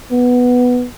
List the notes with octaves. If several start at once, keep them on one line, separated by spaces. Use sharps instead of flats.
B3